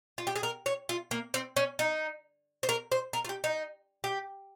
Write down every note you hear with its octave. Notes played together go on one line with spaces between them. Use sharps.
F4
G4
G#4
A#4
C#5
F4
A#3
C4
C#4
D#4
C5
A#4
C5
A#4
F4
G4
D#4
G4